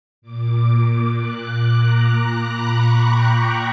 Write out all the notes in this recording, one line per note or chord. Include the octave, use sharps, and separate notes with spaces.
A#2 D6
F#6
F#6
A#5
A#5
B5
C#6
G5